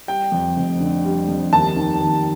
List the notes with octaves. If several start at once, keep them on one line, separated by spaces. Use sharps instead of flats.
G3 G5
F2
F1
D3
G3
F2
D#2 A5
D#3
D#2